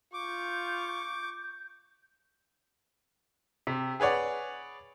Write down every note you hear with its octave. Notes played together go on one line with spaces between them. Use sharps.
F4 C#6 D6 G6
C3
G#4 B4 C#5 D5 F#5